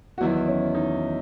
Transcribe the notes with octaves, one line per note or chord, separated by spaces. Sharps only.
F#4
E2 D#3 F#3 E4
C#4
D#4